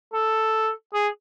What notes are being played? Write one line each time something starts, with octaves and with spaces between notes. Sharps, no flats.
A4
G#4